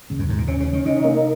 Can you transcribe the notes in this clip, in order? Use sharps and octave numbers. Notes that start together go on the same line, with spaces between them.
D#2 C#3
F#2
D#2 G#2
A#2
C3 C#4
C#3
C#4
D#3
C3 D#4
A#3